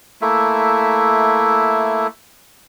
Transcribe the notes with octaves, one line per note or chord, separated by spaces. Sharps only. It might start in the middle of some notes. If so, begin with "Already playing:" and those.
A3 A#3 E4 E5